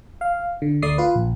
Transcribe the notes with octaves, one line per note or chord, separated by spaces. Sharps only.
F5
D3
D2 A3 D5 D#6 C7
F4 B4
A#1